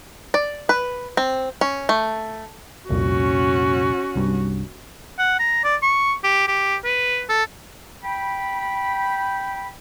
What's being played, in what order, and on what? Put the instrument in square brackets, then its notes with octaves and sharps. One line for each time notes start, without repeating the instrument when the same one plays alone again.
[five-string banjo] D5
B4
C4
C#4
A3
[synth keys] C2 F2 A#2 [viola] C#4 F#4
[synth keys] C2 G2
[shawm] F#5
A#5
D5
C#6
G4
G4
B4
A4
[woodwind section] G5 B5